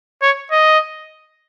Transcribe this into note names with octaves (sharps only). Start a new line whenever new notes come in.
C#5
D#5